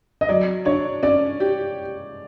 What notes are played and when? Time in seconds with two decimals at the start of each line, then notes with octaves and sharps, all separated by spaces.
0.21 D#5
0.29 F#3 D5
0.65 D4 C#5
1.03 C#4 D5
1.40 G4